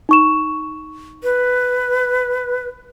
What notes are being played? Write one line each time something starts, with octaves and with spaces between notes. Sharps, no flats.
D#4 C#6 E7
B4